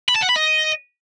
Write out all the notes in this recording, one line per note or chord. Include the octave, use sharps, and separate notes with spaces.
B5
A5
F#5
B5
D#5